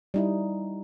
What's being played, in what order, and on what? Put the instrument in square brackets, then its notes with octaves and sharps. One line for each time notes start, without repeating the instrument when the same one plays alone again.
[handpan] G3 D#4 E4